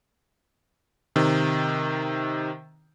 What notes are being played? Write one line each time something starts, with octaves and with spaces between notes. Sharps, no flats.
C3 D#3